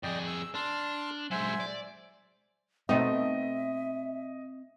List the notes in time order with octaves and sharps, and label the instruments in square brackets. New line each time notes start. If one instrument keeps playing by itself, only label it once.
[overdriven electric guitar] F2 G#4 [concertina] D5 D#5 G5
[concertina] E6
[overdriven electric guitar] D4 [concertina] A5 C6 F6
[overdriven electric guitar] F#3 G#3 [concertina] C5 E5 G#5
[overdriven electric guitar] D5
[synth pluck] B2 A3 D#4 [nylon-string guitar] C4 [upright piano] D#5 [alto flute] E5